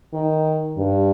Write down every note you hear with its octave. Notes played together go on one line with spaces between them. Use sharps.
D#3
G2